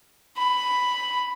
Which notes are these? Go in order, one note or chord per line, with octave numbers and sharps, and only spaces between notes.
B5